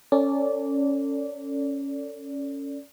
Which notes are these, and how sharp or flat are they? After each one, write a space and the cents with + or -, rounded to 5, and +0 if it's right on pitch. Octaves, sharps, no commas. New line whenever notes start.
C#4 +0 A4 +30 D5 -15